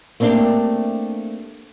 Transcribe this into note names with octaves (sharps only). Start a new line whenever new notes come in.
A3 A#3 C4 D4 G4